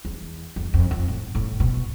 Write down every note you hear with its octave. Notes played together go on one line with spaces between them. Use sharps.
E2
F2
F2
F2
A2
A2
B2